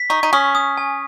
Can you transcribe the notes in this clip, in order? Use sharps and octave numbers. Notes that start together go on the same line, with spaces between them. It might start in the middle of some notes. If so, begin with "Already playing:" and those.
Already playing: B6
D#4 C#6
D#4
C#4 D#6
D#6
G#5